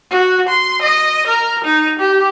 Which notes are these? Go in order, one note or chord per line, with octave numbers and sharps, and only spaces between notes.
F#4
C6
D#5
A#4
D#4
G4